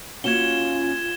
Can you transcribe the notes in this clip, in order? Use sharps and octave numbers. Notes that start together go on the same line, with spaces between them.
A#3 C#4 F4 F#4 F#5 G#6 E7 G7